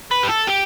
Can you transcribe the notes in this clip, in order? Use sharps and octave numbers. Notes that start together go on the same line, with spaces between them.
B4
G4
A4
G4